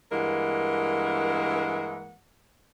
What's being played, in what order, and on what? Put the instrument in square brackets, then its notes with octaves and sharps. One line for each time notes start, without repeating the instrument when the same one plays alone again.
[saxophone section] G2 E3 G#3 A#3 A#4 F#5